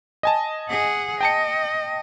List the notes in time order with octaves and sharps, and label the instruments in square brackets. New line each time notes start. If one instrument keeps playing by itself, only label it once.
[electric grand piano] D#5 G#5 A5
[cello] G#4 F#5
[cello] D#5 [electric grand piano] G5 A5 C#7